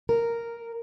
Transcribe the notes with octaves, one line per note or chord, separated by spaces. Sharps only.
A#4